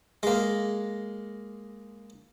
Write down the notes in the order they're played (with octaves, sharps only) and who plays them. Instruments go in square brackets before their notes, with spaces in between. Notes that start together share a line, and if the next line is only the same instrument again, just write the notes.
[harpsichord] G#3 A#3